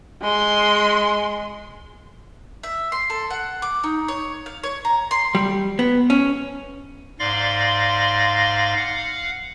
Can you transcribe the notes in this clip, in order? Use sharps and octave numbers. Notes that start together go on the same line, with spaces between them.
G#3 C6
E5
C6
A4
F#5
D6
D#4
C#5
F5
C#5
A#5
C6
G3
B3
C#4
G#2 D5 F5 C6 A#6
F5 F#5